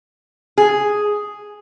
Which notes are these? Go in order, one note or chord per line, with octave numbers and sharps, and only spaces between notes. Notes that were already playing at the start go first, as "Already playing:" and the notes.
G#4